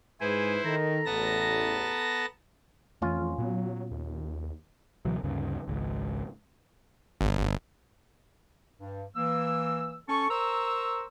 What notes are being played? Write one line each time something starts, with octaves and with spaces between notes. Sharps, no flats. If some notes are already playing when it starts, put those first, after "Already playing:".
G#2 E4 G#4 B4 C5 G#5
D#3 A4 A#5
A1 E2 B3 A5 A#6
A#5
F2 E3 A3 C#4 F4
A#2 F#3 B3
D#2
C#2 B2 E3 F#3
D2 G2 C#3
G#1 C#2 G#2
G1
G2
E3 A#3 E6
C#4 A4 A5 C#6
A#4 C5 A#5 C#6 E6